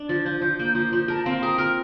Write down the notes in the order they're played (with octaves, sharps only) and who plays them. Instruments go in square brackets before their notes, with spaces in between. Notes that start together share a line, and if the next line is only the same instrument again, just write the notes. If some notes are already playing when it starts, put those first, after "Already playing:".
Already playing: [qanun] D4
[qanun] F3 [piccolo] A6
[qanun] F3 [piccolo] G6
[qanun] F3
A#3
F3
F3
[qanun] A#4 [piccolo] A5
[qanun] C4 [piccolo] F5
[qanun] A#4 [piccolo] D#6
[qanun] A#4 [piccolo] F6